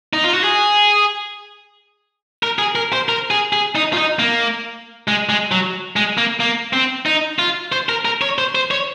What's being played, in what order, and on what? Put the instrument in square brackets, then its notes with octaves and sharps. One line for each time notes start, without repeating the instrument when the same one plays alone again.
[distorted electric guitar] D#4
F4
F#4
G#4
A#4
G#4
A#4
C5
A#4
G#4
G#4
D#4
F4
D#4
A#3
G#3
G#3
F#3
G#3
A#3
A#3
C4
D#4
F4
C5
A#4
A#4
C#5
C5
C5
C#5